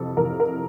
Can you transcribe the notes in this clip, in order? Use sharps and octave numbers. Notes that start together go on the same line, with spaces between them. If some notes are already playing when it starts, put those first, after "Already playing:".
Already playing: F2 C3 E3 A4
F2 C3 E3 A#4
A#4